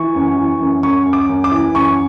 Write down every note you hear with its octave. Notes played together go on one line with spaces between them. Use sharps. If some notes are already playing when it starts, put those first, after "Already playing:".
Already playing: E3 C#6
F#2
E3
F#2
F#2 C#6
F#2
D6
F#2
D6
E3
F#2 C#6